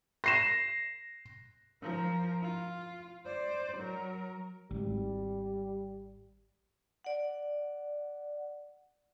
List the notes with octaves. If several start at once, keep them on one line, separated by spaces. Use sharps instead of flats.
A#6 C7 E7
F3 A#4
F4
C5 D5
F#3 A#4
G#1 G3
D5 F#5